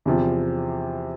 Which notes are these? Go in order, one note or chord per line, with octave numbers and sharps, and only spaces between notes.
E2 C3 F3